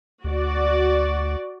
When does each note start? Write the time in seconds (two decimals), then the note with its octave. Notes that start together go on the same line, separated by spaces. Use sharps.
0.24 D2 F#4 D5